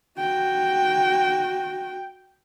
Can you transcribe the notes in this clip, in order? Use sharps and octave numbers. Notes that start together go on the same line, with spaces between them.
F#4 G5